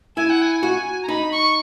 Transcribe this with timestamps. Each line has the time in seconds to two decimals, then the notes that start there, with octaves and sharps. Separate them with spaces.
0.16 E4 G#5
0.30 F#5
0.42 G#5
0.63 F#4
1.03 A#5
1.08 D#4 B5
1.32 C#6